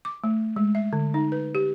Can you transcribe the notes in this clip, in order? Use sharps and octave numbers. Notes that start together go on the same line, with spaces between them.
D6
A3
G#3
E5
D3
D#4
B4
G4